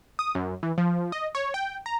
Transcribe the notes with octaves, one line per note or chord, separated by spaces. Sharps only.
D#6
F#2
E3
F3
D#5
C#5
G5
A#5